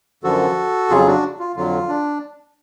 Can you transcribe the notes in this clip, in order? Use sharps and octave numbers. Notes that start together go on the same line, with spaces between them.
F#2 D3 F3 F#4 A4
F2 C#3 F#3 F4 G#4
D4 F#4
F4
F2 D3 F#3 F4
D4